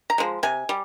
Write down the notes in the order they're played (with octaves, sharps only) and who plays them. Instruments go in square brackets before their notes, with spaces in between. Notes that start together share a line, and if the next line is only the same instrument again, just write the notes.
[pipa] A#5
F3 G#3
C3 G#5
G3